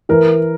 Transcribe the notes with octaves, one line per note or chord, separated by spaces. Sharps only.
E3 A#4